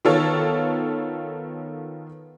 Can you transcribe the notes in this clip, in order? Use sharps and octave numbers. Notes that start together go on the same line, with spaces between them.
D#3 B3 F4 A4 C#5